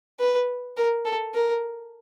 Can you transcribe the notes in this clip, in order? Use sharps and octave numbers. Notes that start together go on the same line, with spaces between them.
B4
A#4
A4
A#4